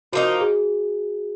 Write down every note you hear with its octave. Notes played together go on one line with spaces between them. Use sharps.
F3 A#3 D#4 F#4
G#4